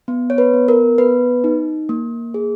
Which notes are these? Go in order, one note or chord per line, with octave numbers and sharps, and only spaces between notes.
B3
C#5
B4
B3
A#4
B3 B4
D#4
A#3
G#4